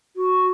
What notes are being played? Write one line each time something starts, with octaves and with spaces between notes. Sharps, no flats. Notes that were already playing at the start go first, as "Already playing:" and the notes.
F#4